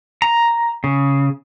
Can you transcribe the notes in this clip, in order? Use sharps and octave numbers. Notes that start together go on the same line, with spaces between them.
A#5
C#3